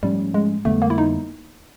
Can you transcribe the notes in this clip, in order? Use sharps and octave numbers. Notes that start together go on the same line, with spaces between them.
G#2 F3 G3 A3 C#4
G#3
F2 D3 G3 A3 B3
A#3
E4
D#4